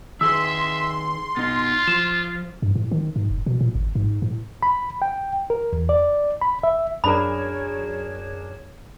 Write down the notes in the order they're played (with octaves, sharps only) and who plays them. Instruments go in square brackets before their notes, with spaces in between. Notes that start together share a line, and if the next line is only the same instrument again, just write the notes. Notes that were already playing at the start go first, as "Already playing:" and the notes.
[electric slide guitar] D#3 G#4 B4 [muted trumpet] E5 [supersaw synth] C6 [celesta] E6
[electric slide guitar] B2 D#4 [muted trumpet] F4
[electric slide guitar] F3 [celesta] E7
[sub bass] G2
A2
D#3
G#2
F1
B2
A#2
G#1
G#2
A2
[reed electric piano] B5
G5
A#4
E2
D5
B5
E5
[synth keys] F#2 G#4 E7 [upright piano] D4 A#4 [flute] C#5 [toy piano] B5